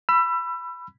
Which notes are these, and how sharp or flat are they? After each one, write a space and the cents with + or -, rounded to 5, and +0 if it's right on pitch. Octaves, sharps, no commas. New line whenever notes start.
B5 +0 E6 +30